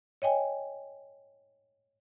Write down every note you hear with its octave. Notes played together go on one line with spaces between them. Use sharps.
C#5 D#5 G5 G#5